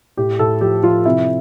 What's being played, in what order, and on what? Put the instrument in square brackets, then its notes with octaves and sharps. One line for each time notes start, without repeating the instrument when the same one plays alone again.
[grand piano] A2 G4
A2 A4
F3 G4
F3 F4
C3 E4